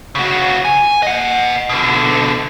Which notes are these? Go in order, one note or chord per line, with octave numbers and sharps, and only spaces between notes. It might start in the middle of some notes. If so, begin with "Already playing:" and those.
C#3 F#4
G#5
D#5 F#5
B2 D3